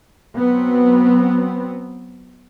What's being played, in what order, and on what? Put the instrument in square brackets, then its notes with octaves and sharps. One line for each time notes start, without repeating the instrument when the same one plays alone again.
[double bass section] F#3 B3 C4